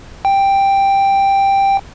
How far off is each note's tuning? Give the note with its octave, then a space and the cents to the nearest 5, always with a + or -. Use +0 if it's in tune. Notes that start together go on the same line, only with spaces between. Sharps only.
G5 +5